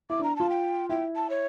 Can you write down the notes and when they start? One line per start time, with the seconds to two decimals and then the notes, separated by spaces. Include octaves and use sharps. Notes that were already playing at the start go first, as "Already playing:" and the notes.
0.10 E4 D6
0.20 D4 A#5
0.36 F4 A5
0.50 G5
0.89 E4 G5
1.16 A5
1.30 C#5